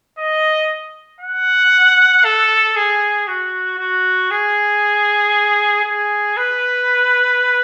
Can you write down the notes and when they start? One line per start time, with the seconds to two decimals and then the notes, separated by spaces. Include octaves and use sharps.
0.18 D#5
1.21 F#5
2.24 A4
2.76 G#4
3.27 F#4
3.78 F#4
4.31 G#4
5.85 G#4
6.37 B4